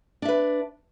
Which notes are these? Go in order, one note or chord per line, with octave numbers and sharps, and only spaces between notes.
D4 B4 E5